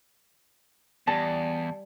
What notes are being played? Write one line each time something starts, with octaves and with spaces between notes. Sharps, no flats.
E2 G3 A5